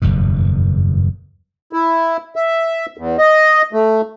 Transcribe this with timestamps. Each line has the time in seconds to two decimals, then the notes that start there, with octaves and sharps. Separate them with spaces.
0.02 F#1 E2 G2 B2
1.73 E4
2.36 E5
2.98 E2
3.18 D#5
3.73 A3